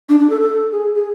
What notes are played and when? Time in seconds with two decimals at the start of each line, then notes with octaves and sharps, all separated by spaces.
0.09 D4
0.20 D4
0.30 A4
0.41 A4
0.72 G#4
0.95 G#4